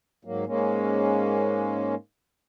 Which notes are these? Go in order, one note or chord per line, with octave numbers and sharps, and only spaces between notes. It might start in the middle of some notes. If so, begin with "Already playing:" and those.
G#2 F#3 A#3
G#2 G#3 A#3 C#4